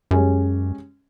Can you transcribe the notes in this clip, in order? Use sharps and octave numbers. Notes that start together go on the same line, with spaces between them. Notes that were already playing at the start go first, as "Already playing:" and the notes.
F#2 G#3 C#4 G4